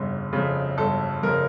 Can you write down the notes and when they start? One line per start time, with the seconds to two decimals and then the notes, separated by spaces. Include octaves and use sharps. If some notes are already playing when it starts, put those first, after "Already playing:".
Already playing: G1 F2 C#3
0.33 F2 C#3
0.78 G1 A4
1.22 F2 C#3 A#4